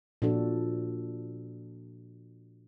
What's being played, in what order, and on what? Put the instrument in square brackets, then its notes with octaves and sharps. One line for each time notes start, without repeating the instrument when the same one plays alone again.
[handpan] A#2 F3 D4 F#4 A4